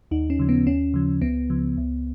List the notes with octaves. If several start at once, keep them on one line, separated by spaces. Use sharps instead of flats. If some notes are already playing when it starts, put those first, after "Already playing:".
D#2 D#4
C#4
C#3 F3
B3
D#2 C#4
C#3 F3
C#2 B3
C#3 F3
C#2